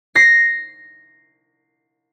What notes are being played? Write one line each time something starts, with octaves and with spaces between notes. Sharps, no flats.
A#6 C7